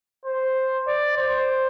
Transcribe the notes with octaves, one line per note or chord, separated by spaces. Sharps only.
C5
D5
C5